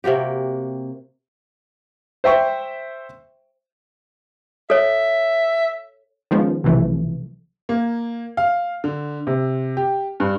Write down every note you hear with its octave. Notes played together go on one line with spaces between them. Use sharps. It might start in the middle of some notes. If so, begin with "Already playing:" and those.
C3 A#3 F#4 G4
C5 E5 G5 C#6
A4 C#5 E5
D#3 F3 G#3 B3 C#4
B1 C3 E3 F3 A3
A#3
F5
D3
C3
G4
G2